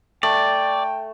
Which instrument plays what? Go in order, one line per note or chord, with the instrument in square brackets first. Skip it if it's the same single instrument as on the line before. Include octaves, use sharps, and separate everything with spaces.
[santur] A3 [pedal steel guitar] D5 [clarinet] G5